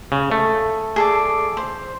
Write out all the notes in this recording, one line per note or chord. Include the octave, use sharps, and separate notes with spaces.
C#3
A3
G#4 A4 D5
C5